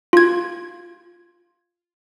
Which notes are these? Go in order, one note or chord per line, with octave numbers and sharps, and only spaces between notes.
F4 G#6